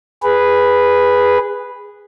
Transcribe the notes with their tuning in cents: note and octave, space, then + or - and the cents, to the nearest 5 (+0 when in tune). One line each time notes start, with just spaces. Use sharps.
G#4 -15 B4 +0